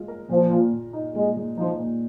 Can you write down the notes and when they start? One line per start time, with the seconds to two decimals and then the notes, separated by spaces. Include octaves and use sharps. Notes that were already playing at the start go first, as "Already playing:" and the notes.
Already playing: G#3 F4
0.08 A#4
0.29 A#2 F3
0.51 A#2
0.73 A#2
0.93 D#4
1.15 A#2 G#3
1.37 G#3
1.58 F3 D#4
1.79 A#2